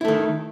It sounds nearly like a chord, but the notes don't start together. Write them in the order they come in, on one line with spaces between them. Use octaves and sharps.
E4 A3 D#3